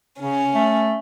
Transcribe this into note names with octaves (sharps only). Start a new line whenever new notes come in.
C#3 C#4
A3